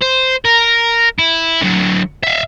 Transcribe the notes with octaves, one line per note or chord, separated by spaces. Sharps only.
C5
A#4
E4
D3 F#3
E5 F5